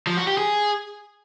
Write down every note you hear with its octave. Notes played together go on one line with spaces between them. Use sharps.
F3
F#4
G4
G#4